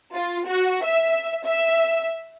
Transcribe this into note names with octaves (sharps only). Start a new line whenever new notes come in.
F4
F#4
E5
E5